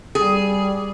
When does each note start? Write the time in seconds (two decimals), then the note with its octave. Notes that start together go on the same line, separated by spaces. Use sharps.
0.15 G3 G#4